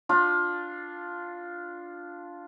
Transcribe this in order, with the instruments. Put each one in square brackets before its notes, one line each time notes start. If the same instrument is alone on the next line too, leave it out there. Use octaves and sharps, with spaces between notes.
[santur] D4 F4